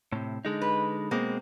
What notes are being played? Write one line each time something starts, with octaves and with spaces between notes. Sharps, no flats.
A2 C3
D3 G#3 D#4
B4
B2 G#3 A#3 C4